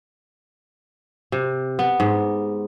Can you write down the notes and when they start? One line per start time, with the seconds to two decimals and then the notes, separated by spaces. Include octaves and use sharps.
1.32 C3
1.79 B3
2.00 G#2